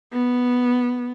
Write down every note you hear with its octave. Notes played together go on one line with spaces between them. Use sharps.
B3